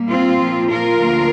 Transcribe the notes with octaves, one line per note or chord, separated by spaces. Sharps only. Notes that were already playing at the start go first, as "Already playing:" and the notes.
Already playing: A#2 G3 A#3
C4 F4
A#2 F3 A#3
F4 A#4
D2 D3 F3 A#3